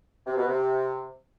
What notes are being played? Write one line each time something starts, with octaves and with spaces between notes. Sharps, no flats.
C3
B2
C3